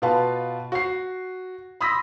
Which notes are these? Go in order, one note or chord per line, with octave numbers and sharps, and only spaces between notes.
B2 F4 B4 F5 A5
F#4 C7
B5 C6 D#6 E6 A#6 B6